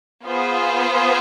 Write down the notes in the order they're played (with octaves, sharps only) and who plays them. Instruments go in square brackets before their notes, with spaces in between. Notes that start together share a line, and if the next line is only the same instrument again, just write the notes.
[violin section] B3 F4 G#4 C5